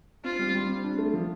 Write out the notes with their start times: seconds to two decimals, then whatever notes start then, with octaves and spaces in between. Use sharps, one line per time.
0.24 C4 F4
0.39 G3
0.54 G3
0.69 C4
0.84 D4
0.98 A3
1.13 F3